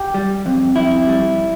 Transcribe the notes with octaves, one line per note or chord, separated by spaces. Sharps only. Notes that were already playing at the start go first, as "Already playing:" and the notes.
Already playing: G4
G3
F2
F2 E4
G3